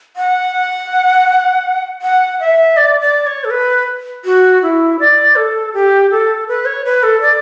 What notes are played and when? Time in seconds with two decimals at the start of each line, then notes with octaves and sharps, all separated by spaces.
0.16 F#5
2.02 F#5
2.40 E5
2.77 D5
3.01 D5
3.27 C#5
3.44 A4
3.51 B4
4.25 F#4
4.62 E4
5.00 D5
5.36 A4
5.74 G4
6.11 A4
6.48 B4
6.66 C#5
6.85 B4
7.03 A4
7.22 D5